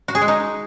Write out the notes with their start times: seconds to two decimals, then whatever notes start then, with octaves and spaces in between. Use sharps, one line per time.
0.08 F#4
0.15 G#4
0.21 G#3
0.28 D#4